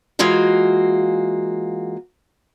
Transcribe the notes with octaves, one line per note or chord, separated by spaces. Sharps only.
E3 G#3 A#3 F4 F#4